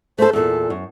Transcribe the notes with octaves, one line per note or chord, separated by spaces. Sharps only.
A3 A4 C5
E2 A#2 A4
F#2